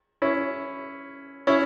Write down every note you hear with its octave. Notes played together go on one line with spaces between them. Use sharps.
C#4 E4
C#4 E4